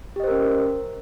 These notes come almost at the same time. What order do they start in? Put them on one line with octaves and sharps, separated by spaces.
G4 D#5 C5 A#4 C#4